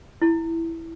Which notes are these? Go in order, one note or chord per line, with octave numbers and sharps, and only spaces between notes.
E4